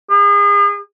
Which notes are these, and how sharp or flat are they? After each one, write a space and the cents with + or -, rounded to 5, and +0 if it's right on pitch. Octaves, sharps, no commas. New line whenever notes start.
G#4 -40